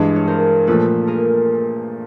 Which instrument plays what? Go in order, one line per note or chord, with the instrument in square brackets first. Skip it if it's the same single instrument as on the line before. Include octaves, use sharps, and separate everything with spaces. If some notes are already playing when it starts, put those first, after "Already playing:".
Already playing: [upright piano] G2 E3 G#3
[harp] C#5
A#4 C5
[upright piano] A#2 F3 A3 [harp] A4 B4
[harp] G#4 A#4